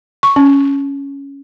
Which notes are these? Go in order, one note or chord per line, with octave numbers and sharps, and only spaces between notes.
C#6
C#4